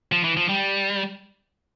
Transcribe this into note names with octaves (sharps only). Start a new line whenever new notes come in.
F3
E3
F3
G3